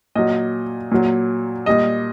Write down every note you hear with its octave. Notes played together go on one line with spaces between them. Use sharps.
A#2 F#3 D#5
A#2 F#3
A#2 G3 D#5